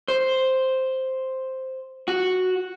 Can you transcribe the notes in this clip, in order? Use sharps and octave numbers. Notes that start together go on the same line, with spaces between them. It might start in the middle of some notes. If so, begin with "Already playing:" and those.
C5
F#4